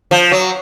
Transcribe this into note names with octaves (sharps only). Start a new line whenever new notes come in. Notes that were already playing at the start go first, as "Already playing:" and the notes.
F3
F#3